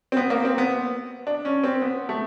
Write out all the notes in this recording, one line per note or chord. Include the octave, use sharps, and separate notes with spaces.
C4
B3
A#3
C4
B3
D4
C#4
C4
B3
A3